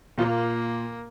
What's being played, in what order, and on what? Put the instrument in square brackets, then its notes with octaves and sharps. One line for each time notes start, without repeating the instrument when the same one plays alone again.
[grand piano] A#2 F4 [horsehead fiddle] A#3